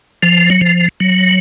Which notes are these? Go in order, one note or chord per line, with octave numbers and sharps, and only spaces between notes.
F3
F#3
F3
F#3